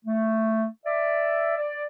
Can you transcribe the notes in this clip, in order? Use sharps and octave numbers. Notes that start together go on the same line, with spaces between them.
A3
D5 E5
D5